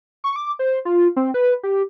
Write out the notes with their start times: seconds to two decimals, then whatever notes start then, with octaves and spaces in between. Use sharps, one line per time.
0.24 C#6
0.36 D6
0.59 C5
0.85 F4
1.16 C4
1.34 B4
1.63 G4